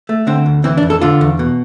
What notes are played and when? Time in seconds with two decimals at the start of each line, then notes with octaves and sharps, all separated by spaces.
0.09 A3
0.27 D3 C4
0.46 D2
0.64 E3 C4
0.77 D4
0.83 F2
0.90 A4
1.01 D3 F4
1.21 E2
1.39 B2